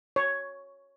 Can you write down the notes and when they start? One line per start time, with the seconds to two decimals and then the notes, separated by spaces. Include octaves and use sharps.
0.16 C#5